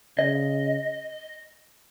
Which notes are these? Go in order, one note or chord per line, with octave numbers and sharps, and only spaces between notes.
C#3 D#5